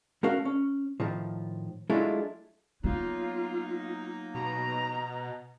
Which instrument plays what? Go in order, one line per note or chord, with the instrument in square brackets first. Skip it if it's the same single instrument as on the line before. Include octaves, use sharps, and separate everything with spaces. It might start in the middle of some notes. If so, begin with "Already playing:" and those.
[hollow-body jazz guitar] A3 C#4 F#4 A#4 F5
C#4
A2 D#3 F3
F#3 G#3 A3 D4 E4 F4
[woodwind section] F#3 A#3 D#4 [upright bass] B3 [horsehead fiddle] F4
[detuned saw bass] B2 [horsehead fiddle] A#5